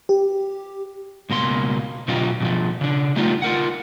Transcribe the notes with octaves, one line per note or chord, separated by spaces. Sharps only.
G4
C#2 B2 A#3 C6
B2 D3 F#3 D#4 F4 G4
B2 E3 F3
C#3 D4
G3 A3 B3 D#4 F4
F4 A#4 F#5